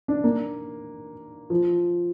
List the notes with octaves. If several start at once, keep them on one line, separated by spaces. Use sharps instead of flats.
D4
A#3
F3